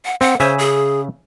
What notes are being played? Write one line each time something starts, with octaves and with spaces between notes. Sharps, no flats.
F#5
C4 F#5
C#3 C5 E5 G#5
G#4